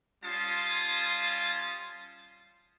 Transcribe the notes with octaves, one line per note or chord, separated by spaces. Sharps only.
G3 C#4 F4 A5 C6 D#6